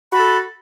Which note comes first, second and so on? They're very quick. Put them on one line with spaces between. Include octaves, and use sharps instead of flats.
F#4 B5 A5 A4